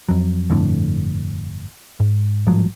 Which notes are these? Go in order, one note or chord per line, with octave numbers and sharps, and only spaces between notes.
F2 F#3
G1 F2 A2 D3
G#2
A1 G#2 F3 F#3